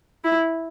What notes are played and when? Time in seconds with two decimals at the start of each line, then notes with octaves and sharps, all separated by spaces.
0.24 E4